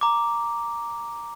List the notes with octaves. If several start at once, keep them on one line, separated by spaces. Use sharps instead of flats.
A#5 D6